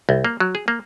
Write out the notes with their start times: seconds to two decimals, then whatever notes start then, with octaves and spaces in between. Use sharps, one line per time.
0.09 C2
0.25 A#3
0.40 F#3
0.55 G#4
0.68 A#3